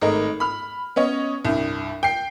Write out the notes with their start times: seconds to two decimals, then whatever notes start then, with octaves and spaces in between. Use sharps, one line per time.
0.01 G#1 G#3 A3 A#4 D#5
0.40 B5 F6
0.96 B3 C#4 C#5 D#5
1.45 C2 G2
2.03 G5 C7